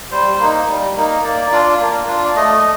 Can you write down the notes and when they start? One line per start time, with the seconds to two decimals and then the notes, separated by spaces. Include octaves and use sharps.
0.11 G3 C5
0.40 A#3 D#4
0.67 G3
0.96 A#3 D#4
1.24 A#3 D5
1.52 D4 F4
1.80 A#3
2.08 D4 F4
2.25 D5
2.36 A3 D#5